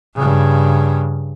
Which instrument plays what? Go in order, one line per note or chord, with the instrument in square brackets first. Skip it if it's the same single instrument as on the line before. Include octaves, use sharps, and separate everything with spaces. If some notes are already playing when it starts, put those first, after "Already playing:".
[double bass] G2 C#3